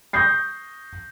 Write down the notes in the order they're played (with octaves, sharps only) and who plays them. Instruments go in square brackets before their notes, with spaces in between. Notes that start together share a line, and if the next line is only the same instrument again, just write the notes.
[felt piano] C#6 D#6 G6 A#6 C7